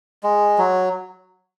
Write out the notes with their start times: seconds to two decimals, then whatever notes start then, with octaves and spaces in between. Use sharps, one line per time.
0.23 G#3
0.58 F#3